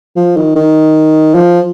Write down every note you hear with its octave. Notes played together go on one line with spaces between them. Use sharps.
F3
D#3
D#3
F3